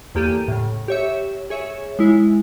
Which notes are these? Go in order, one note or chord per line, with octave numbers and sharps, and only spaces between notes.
E2 A#3 G4 A4 D#7
A2 C#3
G4 C#5 E5
G#4 C#5 E5
G#3 E4